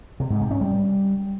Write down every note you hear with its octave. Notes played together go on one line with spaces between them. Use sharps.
C3
G#2
C3
C#4
G3